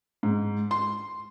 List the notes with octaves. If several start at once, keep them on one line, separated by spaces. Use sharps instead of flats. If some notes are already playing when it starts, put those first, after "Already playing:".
G#2
C6